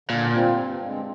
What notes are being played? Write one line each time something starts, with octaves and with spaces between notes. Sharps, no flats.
A#2 D3
G3 C4 F4
G2
D3 G#3 C4